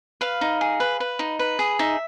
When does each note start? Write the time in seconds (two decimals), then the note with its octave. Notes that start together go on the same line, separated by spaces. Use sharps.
0.21 B4 F5
0.41 D#4
0.61 G#4
0.80 B4
1.00 B4
1.19 D#4
1.39 B4
1.59 G#4
1.79 D#4 E5